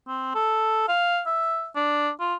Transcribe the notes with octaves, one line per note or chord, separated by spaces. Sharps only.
C4
A4
F5
E5
D4
F4